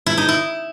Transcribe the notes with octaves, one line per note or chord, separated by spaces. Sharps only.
E4
D#4
E4